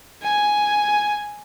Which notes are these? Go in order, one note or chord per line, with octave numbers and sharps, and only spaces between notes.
G#5